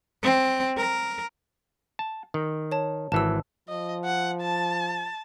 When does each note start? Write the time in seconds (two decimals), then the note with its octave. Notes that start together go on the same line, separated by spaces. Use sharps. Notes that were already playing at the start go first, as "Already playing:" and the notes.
0.23 C4
0.77 A#4
1.99 A5
2.34 D#3
2.72 C#5 A5
3.12 G#1 E3 A5 E6
3.69 F3 D#5
4.05 F#5
4.41 A5